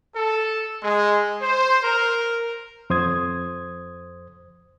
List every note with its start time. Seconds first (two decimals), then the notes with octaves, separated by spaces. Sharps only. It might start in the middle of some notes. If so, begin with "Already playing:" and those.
0.15 A4
0.83 G#3
1.41 C5
1.83 A#4
2.90 F2 C5 D#6 G#6